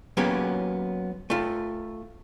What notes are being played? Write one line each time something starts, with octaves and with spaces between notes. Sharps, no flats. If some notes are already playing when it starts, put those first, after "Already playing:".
F#3 A#3 B3 C#4 F#4 G4
A3 F4